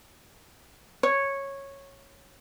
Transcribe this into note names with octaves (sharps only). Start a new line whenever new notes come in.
C#5